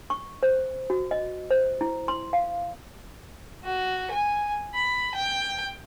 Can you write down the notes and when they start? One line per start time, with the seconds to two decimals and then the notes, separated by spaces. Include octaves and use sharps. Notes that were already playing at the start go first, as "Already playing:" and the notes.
0.10 C#6
0.43 C5
0.90 F#4
1.11 D#5
1.51 C5
1.81 E4
2.08 C6
2.33 F5
3.64 F#4
4.11 G#5
4.75 B5
5.15 G5